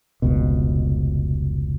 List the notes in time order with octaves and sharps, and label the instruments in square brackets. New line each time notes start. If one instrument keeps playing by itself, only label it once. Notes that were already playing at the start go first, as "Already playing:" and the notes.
[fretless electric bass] F1 C#2 B2